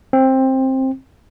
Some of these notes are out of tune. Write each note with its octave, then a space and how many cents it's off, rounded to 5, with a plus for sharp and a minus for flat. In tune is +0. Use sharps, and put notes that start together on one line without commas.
C4 +15